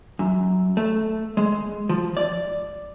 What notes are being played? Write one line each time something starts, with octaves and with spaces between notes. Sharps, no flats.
F#2
A3
G#3
F3
D5